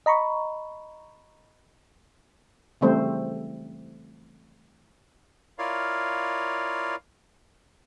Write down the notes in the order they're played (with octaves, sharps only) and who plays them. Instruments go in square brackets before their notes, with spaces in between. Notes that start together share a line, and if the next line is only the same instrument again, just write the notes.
[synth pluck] D#5 A#5 B5 C#6
[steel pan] C#3 E3 G3 A3 C4 C5
[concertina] E4 F4 A#4 C#5 D5 F5